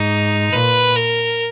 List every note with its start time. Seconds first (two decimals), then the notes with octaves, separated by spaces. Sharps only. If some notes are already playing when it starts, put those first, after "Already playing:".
Already playing: G#2 D#4
0.52 A#2 B4
0.96 A#4